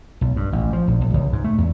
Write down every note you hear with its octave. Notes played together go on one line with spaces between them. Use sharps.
B1
G2
A1
F3
A#1
A#1
C#2
G#2
A3
E2